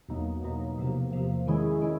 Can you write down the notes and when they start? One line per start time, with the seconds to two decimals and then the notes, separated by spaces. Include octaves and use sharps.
0.08 E2 B2 F#3 A#3 D#4
0.43 E2 B2 F#3 A#3 D#4
0.78 E2 C3 F3 A#3
1.12 E2 C3 F3 A#3
1.47 D#3 G#3 C#4 E4 G#4
1.81 D#3 G#3 C#4 E4